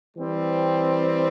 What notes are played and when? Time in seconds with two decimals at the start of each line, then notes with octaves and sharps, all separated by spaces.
0.17 E3 G3 C4